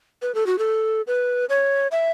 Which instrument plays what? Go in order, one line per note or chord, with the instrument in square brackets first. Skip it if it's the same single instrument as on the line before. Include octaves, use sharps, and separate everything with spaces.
[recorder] B4
A4
F#4
A4
B4
C#5
E5